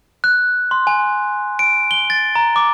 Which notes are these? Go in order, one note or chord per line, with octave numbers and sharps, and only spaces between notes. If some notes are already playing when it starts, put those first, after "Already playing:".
F#6
C6
G#5
D7
G7
A6
A#5
D6